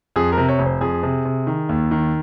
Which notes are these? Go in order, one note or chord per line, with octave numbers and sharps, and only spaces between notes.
F2 G#4
A#4
C3
C#5
F1
C5
F2 G#4
C3
C3
D#3
D#2
D#3